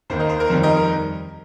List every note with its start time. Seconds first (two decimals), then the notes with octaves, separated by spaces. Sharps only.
0.10 D#2 D#3 A#3 C5
0.19 A#4 D#5
0.29 C5
0.40 A#4
0.50 F2 D#3 G3 C5
0.63 A#4 D#5
0.77 A#4